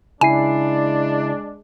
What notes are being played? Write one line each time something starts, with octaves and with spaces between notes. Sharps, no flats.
C#3 G#3 D4 E4 G#5 C7